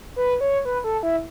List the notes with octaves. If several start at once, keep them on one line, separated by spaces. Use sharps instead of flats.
B4
C#5
B4
A4
E4